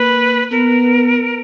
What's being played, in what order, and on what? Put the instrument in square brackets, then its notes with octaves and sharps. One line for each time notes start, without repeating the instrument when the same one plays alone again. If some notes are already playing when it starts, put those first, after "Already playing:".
Already playing: [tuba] A#3 [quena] B4
[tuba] B3 [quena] A#4